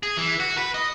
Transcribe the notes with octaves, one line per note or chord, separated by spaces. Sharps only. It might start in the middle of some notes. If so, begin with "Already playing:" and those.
G#4
E3
F#4
B4
D#5